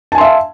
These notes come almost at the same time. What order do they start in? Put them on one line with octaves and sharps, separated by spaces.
A5 G#5 C6 E5 F5